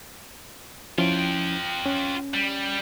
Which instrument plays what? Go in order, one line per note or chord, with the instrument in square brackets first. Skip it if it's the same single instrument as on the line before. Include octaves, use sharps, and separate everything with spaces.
[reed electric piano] F3 C#4 E4 [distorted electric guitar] F4 G5
[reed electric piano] C#4
[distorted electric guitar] G3